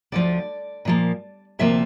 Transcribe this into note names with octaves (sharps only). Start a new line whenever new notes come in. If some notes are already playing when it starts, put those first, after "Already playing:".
D2 D3 F3 D5
A#2 F3 A#3
D2 C3 F3 A#3 E5